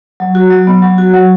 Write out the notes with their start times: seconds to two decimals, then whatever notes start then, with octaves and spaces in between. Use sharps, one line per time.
0.20 F#3
0.35 F#4
0.50 F#3
0.67 B3
0.82 F#3
0.98 F#4
1.14 F#3